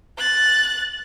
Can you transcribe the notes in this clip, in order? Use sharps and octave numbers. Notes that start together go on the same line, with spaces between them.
F#6 A6